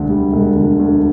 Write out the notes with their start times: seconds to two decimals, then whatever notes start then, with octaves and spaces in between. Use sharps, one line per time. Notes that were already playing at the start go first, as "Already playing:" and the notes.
Already playing: E1 D2 D3
0.10 G3
0.33 E1
0.56 D3
0.79 D2